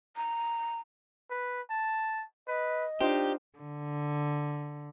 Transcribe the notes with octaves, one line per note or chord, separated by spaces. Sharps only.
A#5
B4
A5
B4 D#5
D4 D#4 F4 G4 C5
D3